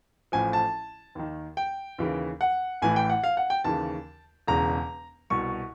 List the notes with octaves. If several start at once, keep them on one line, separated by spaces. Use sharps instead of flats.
A1 A2 F3 G#5
A5
D#2 D#3
G5
D#2 C#3 E3
F#5
A1 A2 E3 G#5
G5
F#5
F5
F#5
G5
D#2 C#3 E3 A5
E1 E2 C#3 A#5
C2 B2 C#6